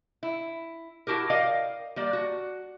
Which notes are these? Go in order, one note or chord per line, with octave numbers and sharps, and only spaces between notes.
E4
E4 F#4 G4 A#4
A#4 D5 D#5 F5 G5
G3 A#3 D5
F#4